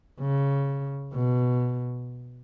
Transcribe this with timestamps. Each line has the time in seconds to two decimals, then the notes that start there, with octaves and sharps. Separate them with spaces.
0.20 C#3
1.13 B2